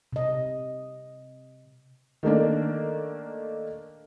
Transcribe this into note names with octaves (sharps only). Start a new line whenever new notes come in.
C3 D#5
D#3 A3 A#3 D4